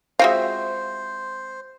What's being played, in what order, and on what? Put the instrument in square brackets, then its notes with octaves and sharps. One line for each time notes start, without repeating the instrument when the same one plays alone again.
[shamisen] G#3 F4 F5 [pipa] C4 F#4 E5 [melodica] C5